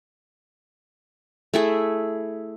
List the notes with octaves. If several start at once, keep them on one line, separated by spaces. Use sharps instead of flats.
A3 E4 G#4